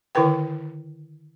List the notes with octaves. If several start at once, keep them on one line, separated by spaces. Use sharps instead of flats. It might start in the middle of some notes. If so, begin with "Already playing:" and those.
D3 D#3 E4 A#4 B4 G5